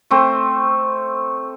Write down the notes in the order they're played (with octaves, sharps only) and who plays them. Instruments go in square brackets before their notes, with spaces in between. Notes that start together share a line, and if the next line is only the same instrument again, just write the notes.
[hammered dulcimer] A3 C4